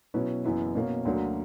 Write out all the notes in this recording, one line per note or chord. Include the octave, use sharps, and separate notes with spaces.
B2 F#3 C#4 E4 B4
F#1 F#2 E3 B3 E4
B2 A#3 C#4
D2 D3 F#3 A#3